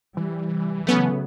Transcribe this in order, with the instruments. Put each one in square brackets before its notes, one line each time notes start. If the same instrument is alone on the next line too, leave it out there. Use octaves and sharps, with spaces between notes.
[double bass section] C3 G3 [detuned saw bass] E3
[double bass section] C#3 F#3 [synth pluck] A3 B3 C#4